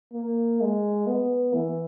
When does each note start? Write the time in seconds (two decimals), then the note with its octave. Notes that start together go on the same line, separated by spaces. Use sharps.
0.13 A#3
0.60 G#3
1.06 B3
1.54 E3